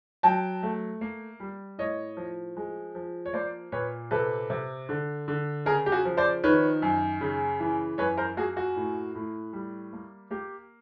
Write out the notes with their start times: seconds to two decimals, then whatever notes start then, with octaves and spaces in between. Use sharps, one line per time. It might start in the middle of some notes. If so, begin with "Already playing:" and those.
0.23 F#3 G5 A5
0.63 A3
1.01 A#3
1.40 G3
1.78 A2 C#5 D#5
2.17 F3
2.57 G#3
2.95 F3
3.26 C#5
3.33 A#3 C5 D5
3.72 A#2 B4 C#5
4.11 C3 A4 B4
4.50 C3
4.89 D3
5.28 D3
5.66 C#3 G#4 A#4
5.86 G4
5.92 F#4 G#4
6.05 F3
6.17 C5 D5
6.44 D#3 B4 C#5
6.82 F#2
7.21 C#3
7.60 E3
7.98 F#2 B4 C#5
8.17 A#4 C5
8.37 A#3 F#4 G#4
8.57 F#4
8.76 A2
9.15 A2
9.53 G3
9.93 A#3
10.31 A#3 G4